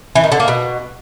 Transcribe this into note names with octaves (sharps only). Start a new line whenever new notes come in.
E3
D#3
D3
A#3
B2